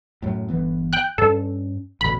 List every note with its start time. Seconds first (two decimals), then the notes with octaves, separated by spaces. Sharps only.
0.22 F#2 A2
0.49 G1 E3 B3
0.93 G5 F#6
1.18 G2 C#4 A4
2.01 A1 D2 B2 B5